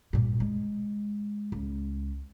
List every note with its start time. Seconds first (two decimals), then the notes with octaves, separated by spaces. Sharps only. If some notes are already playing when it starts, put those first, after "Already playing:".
0.13 G2 A#2
0.40 G#3
1.52 C#2